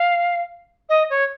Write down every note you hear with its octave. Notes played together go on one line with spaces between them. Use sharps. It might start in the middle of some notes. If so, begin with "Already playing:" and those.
Already playing: F5
D#5
C#5